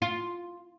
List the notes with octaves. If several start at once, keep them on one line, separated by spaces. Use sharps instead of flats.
F4